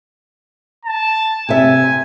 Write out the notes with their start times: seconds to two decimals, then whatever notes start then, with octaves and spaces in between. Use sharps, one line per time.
0.85 A5
1.49 C3 E5 G#5